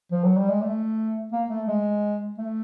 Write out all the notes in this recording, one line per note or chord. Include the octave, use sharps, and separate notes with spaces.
F3
F#3
G3
G#3
A3
A#3
A3
G#3
A3